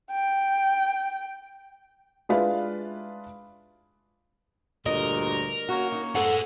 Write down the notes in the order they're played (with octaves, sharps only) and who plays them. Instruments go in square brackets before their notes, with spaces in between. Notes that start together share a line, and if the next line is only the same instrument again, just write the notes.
[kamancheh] G5
[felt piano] G#3 D4 E4 F4 B4 F5
[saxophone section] D2 G2 A#2 [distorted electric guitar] A#4 [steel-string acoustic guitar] D#5
[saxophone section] A#3 C#4 C#5 [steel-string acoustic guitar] F#4
[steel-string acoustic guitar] D#4
[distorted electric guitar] G#4 C5 [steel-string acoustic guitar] A4 F#5